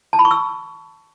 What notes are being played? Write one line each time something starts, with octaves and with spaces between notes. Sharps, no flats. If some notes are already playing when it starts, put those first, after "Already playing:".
A5
B5
C#6
E6